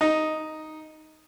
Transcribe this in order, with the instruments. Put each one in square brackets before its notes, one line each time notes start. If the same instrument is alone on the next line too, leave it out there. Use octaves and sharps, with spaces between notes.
[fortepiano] D#4